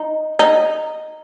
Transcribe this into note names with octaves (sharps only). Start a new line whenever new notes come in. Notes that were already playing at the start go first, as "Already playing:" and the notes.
Already playing: D#4
D#4